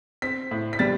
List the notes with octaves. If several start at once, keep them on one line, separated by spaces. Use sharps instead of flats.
C4 B6
A2
B6
G3 A6